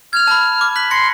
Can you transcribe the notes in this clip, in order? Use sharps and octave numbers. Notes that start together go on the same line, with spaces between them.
F6 G#6 F7
A5 B5
D6
F#6 B6 F#7
C6 G#6 A#6 C#7